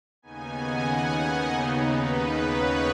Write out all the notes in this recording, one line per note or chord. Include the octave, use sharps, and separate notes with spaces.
D#2 C#3 B3 D#4 G#5
F#5
D#5
D#2 C#3 B3 D#4 C#5
B4
B4
C#5